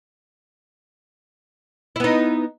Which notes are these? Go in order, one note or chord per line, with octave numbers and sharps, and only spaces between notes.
B3 D#4 E4